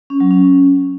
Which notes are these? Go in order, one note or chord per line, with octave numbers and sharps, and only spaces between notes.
C#4
F#3
C#4